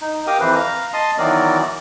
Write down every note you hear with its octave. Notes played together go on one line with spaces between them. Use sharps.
D#4
G4 A#4 F5 G5 D#6
F2 E3 B4 C5
F5 A#5
D#5 A5 C6 D#6
D#3 E3 F#3 B3 A#4 D5